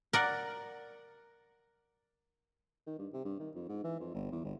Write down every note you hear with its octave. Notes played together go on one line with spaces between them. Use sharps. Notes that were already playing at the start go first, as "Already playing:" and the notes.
A#4 D5 F#5
D#3
G2
C3
G2
D#3
F2
G#2
E3
F2
G1
E2
G1